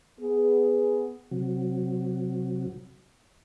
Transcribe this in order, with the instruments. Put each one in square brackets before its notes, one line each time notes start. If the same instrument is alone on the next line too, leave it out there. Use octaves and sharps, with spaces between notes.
[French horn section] B3 G#4
[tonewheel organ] C3 F#3